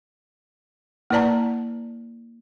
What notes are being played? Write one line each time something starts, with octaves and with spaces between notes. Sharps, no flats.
A#3 E4 B4 D5 A5 A#5